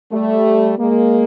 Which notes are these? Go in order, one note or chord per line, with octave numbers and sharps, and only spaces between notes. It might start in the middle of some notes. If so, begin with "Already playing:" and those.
G3 A3
G#3 A#3